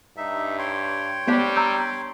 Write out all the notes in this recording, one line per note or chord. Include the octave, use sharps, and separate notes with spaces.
G2 D#4 E5
C#5 G5 C6
G3 B3 D4 G4 C5
A#5 E6 G6